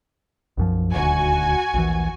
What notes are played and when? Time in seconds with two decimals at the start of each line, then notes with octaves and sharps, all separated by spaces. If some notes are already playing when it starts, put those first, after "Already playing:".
0.57 B1 F#2 F3
0.94 D#1 D2 F#4 G#5
1.74 A#1 D#2 E3